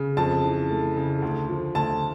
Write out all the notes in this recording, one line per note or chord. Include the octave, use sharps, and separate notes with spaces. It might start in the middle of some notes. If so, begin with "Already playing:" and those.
Already playing: C#3
F2 A5
E3
A3
C#3
D2
F3
D2 A5